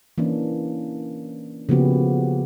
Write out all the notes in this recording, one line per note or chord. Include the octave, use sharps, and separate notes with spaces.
E3 A#3 C#4 D4
C#3 F3 A#3 B3 F#4 G4